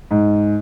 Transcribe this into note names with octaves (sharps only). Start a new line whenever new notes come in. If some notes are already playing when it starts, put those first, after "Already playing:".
G#2